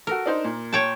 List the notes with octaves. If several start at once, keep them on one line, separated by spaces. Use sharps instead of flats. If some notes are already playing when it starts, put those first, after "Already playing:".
F#4 A4 A#4
D4 D#4 C5
A#2
C#5 G5 A5